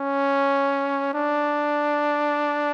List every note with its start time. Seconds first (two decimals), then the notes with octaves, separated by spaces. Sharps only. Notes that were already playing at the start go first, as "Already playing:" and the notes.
Already playing: C#4
1.14 D4